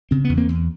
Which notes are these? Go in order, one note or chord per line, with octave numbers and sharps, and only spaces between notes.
C#3 C4
E2 B3
A#3 C4
E2